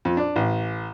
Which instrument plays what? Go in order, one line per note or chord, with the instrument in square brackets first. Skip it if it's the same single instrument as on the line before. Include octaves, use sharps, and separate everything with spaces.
[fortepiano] F2
D4
A1